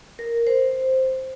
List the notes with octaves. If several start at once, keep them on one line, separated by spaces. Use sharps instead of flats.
A#4
C5